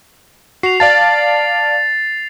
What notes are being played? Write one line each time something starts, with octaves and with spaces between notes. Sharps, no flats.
F#4 C7 F7
D5 F5 A5 A6